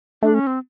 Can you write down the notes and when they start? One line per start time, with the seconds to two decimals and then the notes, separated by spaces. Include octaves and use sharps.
0.22 A3 D4
0.34 C#4
0.47 C4